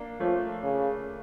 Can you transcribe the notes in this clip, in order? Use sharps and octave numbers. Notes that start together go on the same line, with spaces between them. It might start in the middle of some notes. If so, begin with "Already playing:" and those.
Already playing: A#3 D4
F3 A3 C#4
C#3